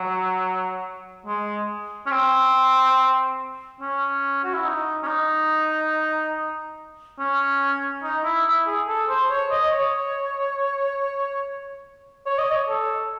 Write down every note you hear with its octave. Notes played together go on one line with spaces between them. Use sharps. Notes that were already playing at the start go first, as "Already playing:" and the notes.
Already playing: F#3
G#3
C#4
C4
C#4
F#4
E4
D#4
C#4
D#4
C#4
D#4
E4
E4
G#4
A4
C5
C#5
D#5
C#5
C#5
D#5
C#5
A4